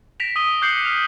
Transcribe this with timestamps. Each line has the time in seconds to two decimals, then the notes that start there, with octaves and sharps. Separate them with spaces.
0.20 A#6 B6 D7 E7 F7
0.36 D#6 E6 D#7 G7
0.62 D6 F#6 G6 C7 C#7 F#7
0.85 F6 F7